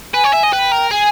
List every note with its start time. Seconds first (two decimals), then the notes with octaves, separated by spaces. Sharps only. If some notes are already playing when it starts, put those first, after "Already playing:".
0.14 B4 G#5
0.24 C#5
0.33 E5
0.44 D#5
0.53 B4 G5
0.72 A#4
0.91 G#4 G#5